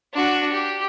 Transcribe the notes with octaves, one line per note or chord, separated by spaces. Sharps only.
D4 F#4
G4